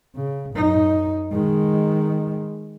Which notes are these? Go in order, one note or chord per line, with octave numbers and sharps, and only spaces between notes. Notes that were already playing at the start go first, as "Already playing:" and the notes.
C#3
F#2 D#4
D#3 G#3